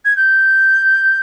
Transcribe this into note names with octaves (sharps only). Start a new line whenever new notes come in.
G#6
G6